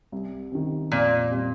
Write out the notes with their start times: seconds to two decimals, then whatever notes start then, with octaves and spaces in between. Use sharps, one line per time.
0.12 C2
0.51 C3 D#3
0.92 F2 A#2
1.30 C3 G3 C4